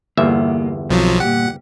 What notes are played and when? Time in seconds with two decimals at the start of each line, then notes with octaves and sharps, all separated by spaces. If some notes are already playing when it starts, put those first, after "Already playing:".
0.17 G1 E2 A#3 B3 E5
0.90 B1 F3 F#3 C4 F4
1.20 A#2 G3 G4 F#5